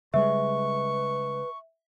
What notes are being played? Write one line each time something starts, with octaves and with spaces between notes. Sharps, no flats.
C#3 G3 G#3 B4 E5 C#6